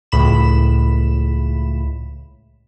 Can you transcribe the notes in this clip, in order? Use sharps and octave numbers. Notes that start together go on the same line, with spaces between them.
C#2 A2 B5 E7